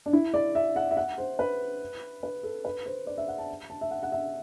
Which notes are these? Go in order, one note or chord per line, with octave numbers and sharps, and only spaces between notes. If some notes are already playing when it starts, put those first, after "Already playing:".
D4
E4
D5
E5
F#5
E5
F#5
C5
B4
B4
A4
B4
C5
D5
E5
F#5
A5
A5
E5
F#5
F#5
E5